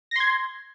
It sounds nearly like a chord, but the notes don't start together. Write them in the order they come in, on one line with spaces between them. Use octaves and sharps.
A#6 C6 G#6